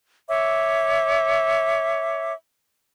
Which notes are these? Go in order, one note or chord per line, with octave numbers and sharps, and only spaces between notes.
C#5 E5 D6